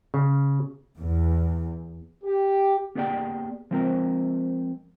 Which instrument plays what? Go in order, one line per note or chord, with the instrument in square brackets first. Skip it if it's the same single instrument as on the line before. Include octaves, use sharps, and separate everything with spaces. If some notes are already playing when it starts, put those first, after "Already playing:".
[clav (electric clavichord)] C#3
[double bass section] E2
[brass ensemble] G4
[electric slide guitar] A#3 B3 G4 G#4 D5 G5
F3 G#3 C4 A#4 C5